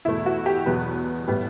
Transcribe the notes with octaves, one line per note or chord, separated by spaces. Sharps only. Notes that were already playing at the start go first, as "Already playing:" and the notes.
E2 B2 A3 E4
F#4
G4
E2 B2 F#3 B4
A2 G3 B3